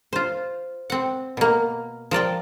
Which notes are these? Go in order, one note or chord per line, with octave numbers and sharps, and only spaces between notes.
F4 C5
C4 F#5
B2 A#3
F3 A#4 D5 G5